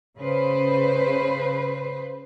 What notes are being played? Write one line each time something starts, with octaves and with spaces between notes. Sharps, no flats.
C#3 B4 C5